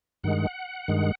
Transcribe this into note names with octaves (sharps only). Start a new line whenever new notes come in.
G2 D#3 G#3 F#5
G2 D#3 G#3